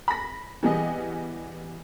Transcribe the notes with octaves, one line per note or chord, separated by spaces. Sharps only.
B5 A#6
E3 G3 B3 G#4 D#5